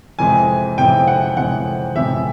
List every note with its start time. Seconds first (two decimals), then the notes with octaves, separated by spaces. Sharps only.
0.19 F2 C3 E3 G#3 G#5
0.77 F2 C3 E3 G#3 G5
1.08 F#5
1.37 F2 C3 E3 G#3 F#5
1.96 F2 C3 E3 G#3 E5